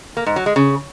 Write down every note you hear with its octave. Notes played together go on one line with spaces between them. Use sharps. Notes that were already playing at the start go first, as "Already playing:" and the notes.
A#3
G#2
F#3
G#3
C#3